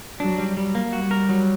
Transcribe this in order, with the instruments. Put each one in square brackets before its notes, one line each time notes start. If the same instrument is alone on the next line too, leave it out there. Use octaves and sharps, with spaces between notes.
[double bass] F#3 [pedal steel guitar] D4
[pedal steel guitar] G3
G3
A#3
[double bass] G3 [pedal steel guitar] F#4
[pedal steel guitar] A#4
F#3